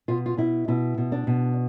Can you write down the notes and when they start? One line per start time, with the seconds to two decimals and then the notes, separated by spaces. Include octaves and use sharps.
0.08 B2 F4
0.26 F4
0.37 B2 E4
0.68 B2 E4
0.98 B2
1.12 D4
1.27 B2